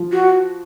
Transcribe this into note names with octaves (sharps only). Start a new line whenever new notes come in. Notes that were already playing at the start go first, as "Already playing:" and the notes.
Already playing: F3
F#4